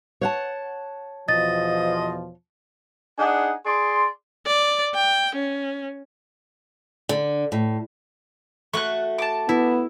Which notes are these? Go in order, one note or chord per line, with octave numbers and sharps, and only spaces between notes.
C#5 F#5 A5
E2 B2 F3 D#5 A6
D4 D#4 G#4 F#5 G#5
G#4 D5 C6
D5
G5
C#4
D3
A2
A3 F#4 C#6 F#6
A5 D6
B3 E4